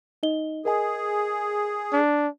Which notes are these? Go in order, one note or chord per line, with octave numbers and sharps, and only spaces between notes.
D#4 D#5 G7
G#4 A#4 D#5 G#5
D4